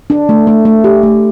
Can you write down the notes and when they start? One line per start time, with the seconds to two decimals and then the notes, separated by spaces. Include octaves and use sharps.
0.10 D4
0.29 A3
0.47 A3
0.65 A3
0.84 G4
1.03 A3